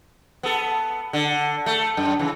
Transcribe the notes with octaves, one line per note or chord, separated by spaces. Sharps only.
B3 A4
D3
A3
F#2
C#3 E3